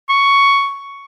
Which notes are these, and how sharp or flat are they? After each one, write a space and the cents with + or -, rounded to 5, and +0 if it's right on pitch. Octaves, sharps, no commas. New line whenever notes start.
C#6 +5